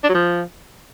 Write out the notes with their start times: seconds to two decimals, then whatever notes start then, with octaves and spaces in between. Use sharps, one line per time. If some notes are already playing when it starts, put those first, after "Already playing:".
0.04 D4
0.09 F#3
0.14 F3